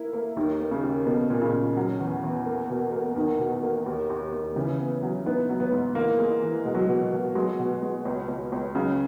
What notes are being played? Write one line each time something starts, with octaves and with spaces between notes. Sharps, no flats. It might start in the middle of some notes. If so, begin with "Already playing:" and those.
Already playing: A#3 E4
A#3
D#2 D#3
A#3
C#3
D#2
B2 A#3
A#2
C#3
A#2
F#3
E2
E2
A#3
B2
A#3
E2 D#3
B2
A#3
D#2
D#2
D#2
C#3 E3
B3
F#3
B3 D#4
F#3
B3
G#2
E3 A#3
G#3
E3
B2 G#3
F#3
B2 G#3
B2
F#3 G#3
B2
G#3
C#2
C#2
C#2
C#3 F#3